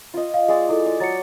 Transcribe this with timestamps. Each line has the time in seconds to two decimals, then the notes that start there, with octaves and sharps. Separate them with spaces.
0.14 F4 D#5
0.34 F5
0.48 G#3 D5
0.69 E4 A4
0.86 D5
1.00 F#3 A6 C#7